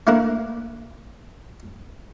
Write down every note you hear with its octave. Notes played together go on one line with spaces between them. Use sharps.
A3 A#3 D4 E4 A#4 B4